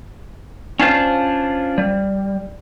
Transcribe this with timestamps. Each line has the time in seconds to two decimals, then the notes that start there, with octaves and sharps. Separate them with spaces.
0.79 C#4 D4 F4 C5
1.78 G3